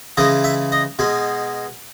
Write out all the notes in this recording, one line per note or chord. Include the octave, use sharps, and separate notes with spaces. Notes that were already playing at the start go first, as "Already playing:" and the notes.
C#3 E3 G#3 D#5
E5
D#5
B2 G#3